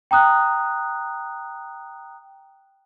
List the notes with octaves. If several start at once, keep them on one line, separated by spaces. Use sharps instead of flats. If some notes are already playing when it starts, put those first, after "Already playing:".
G5 A#5 D#6 F#6